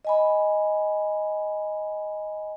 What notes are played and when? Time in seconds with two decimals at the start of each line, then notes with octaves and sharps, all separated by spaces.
0.05 D#5 G#5 B5